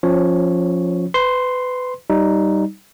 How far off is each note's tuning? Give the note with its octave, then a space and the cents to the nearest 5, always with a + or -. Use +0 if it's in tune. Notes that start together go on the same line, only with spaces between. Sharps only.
F3 +10 C#4 -15 C#5 +0
B4 +25 C6 +0
G3 -15 D#4 +0